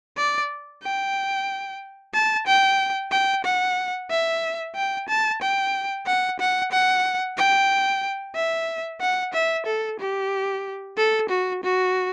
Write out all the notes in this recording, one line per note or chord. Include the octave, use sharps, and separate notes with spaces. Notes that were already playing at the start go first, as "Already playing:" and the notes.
D5
G5
A5
G5
G5
F#5
E5
G5
A5
G5
F#5
F#5
F#5
G5
E5
F#5
E5
A4
G4
A4
F#4
F#4